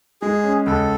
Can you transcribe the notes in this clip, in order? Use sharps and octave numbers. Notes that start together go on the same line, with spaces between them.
G#3 G#4
C#4
C#2 A4